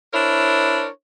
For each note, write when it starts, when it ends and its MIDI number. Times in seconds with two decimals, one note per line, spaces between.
0.14 0.87 62
0.14 0.87 64
0.14 0.87 70
0.14 0.87 72
0.14 0.87 73